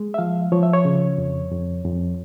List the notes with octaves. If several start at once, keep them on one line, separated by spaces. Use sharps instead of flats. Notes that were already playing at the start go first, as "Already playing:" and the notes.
Already playing: G#3
E5
F3 F5
F3 C#5
E5
C#5
C#3
F2
F2
F2